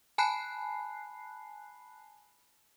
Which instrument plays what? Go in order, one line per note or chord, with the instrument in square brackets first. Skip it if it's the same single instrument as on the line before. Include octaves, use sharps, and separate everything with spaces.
[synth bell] G#5 A5 B5 F#6 C7